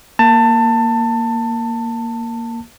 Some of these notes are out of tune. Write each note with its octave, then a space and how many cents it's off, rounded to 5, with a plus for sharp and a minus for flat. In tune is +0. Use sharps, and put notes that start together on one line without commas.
A#3 +0 A5 +20